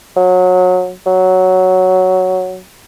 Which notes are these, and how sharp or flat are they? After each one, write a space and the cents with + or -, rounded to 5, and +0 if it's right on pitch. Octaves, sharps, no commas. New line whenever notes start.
F#3 -25
F#3 +5